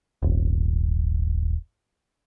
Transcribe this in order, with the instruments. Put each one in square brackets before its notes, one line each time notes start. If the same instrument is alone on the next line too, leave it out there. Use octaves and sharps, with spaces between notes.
[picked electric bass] D#1 G#1